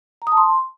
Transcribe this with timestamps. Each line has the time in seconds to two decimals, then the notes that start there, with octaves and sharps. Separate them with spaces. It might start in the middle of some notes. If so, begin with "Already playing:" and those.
0.22 A#5
0.27 D#6
0.32 A5
0.37 C6